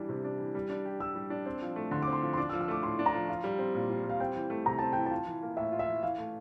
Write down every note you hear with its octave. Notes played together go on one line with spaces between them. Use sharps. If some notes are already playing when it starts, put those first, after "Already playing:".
Already playing: E3 G3 D4
C3
D4
E3
G3
D4
G4
G3 E6
G3
D4
C4
F3
A3
D3 C6
C4 D6
C6
F3
C6
D4 D6
E6
F3
E6
A3 D6
A2 C6
D4
A#5
F3
F4
G3
C4
A#2
F4
G3
F5
C4 G5
E3
A3
C3 A#5
C4 A5
E3 G5
F4 A5
E3
A#3
A2 E5
F4
E5
E3
E3 F5
A3